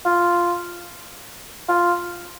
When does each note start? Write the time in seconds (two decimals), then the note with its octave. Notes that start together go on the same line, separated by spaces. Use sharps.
0.05 F4
1.68 F4